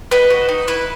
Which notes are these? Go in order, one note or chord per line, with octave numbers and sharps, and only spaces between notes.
B3 B4 D#5
F#4
D#4
E4 B4